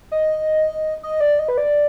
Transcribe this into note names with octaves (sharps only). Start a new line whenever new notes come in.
D#5
D#5
D5
D#5
B4
D5